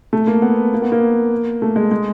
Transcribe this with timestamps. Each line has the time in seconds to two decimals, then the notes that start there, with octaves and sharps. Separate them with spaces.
0.13 A3
0.27 A#3
0.42 B3
0.74 A#3
0.82 B3
0.92 A#3
1.62 A3
1.76 G#3
1.91 G#3